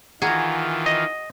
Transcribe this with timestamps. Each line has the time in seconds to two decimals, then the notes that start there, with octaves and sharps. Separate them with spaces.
0.22 D#3 E3 F4 F#4 G#4 A#5
0.86 D#5